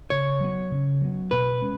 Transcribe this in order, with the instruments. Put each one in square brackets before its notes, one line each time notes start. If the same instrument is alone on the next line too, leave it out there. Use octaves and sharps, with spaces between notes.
[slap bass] C#3 [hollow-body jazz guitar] C#5
[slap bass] F#3 B3
C#3
F#3 B3
[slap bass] B2 [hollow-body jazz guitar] B4
[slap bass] G#3 C#4